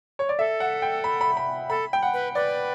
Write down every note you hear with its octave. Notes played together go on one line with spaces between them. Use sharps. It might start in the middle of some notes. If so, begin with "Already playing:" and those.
C#5
D5
A4 E5
F#5
G5
B5
B5
B5
A4 B5
G5
F#5
B4
B4 D5